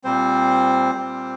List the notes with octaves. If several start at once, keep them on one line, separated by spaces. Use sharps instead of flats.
A#2 G3 C4 C5
A#2 G3 C4